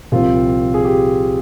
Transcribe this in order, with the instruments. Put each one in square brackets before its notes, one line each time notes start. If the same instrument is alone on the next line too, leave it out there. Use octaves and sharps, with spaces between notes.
[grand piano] C2 A#2 F3 C4 F4
G#4
G4